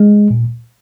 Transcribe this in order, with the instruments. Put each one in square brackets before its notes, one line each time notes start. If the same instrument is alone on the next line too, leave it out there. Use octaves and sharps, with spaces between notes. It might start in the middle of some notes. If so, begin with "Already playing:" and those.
Already playing: [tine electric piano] G#3
A#2